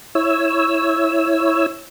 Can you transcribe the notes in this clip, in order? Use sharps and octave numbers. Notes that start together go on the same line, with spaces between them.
E4 C#5 E6